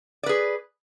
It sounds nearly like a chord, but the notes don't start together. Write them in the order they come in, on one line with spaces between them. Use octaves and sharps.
D5 B4 G#4